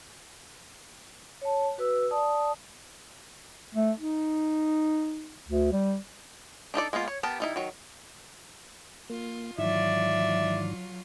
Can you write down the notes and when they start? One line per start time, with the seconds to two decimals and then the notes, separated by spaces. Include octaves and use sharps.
1.42 C#5 A5
1.78 F#4 B4 E6
2.11 D5 A5 D#6
3.75 A3
4.00 D#4
5.48 D2
5.72 G3
6.74 D4 D#4 A4 D5
6.93 G#3 A#3 B3 F4
7.08 C#5
7.23 B3 G4 A#4 A5
7.40 G3 D#4 E4
7.56 D#3 F#3
9.10 A#3 F4
9.58 G#2 D#3 E3 F#3 F4 D5 E5